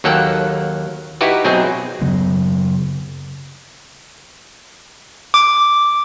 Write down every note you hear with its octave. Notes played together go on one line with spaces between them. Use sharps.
D#2 F#3 A#3 A4 F#5 G5
D#4 E4 F#4 G4 B4
B2 F#3 C4 D#4 G#4
C#3 F#3 B3
D6